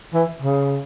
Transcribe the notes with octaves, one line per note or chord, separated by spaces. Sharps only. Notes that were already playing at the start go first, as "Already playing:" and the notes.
E3
C#3